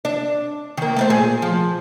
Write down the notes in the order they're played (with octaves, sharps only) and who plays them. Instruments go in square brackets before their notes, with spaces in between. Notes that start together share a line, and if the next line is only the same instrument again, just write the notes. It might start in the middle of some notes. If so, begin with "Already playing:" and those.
[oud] D4
D#3 A#3
A3 A#4 C5
A#2 G#4
F3